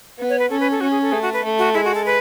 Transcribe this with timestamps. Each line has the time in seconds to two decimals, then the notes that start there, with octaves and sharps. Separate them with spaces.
0.19 B3
0.29 C#5
0.39 B4
0.50 C#4 A4
0.60 B4
0.71 A4
0.81 C#4 F#4
0.91 G#4
1.02 A4
1.12 A3 G#4
1.22 F#4
1.33 B4
1.44 A3
1.59 F#4
1.74 G#3 E4
1.85 F#4
1.95 A4
2.06 B4